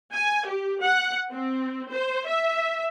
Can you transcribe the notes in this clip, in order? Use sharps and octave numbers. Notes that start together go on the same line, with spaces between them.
G#5
G4
F#5
C4
C5
E5